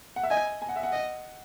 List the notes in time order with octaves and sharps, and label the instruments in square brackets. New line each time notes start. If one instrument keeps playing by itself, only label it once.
[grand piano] F#5
E5
[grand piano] D#5 [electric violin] G#5
[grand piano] G#5
F#5
E5
F#5
[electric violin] D#5